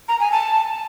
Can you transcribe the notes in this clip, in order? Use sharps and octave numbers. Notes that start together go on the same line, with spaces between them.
A#5
G#5
A5